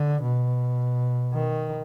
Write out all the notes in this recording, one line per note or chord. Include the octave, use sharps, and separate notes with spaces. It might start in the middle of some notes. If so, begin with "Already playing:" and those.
Already playing: D3
B2
D#3